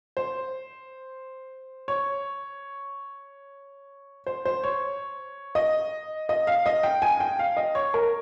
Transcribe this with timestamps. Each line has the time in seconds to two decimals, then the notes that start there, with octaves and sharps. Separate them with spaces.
0.17 C5
1.88 C#5
4.27 C5
4.45 C5
4.64 C#5
5.55 D#5
6.29 D#5
6.47 F5
6.66 D#5
6.83 G5
7.02 G#5
7.20 G5
7.39 F5
7.57 D#5
7.75 C#5
7.94 A#4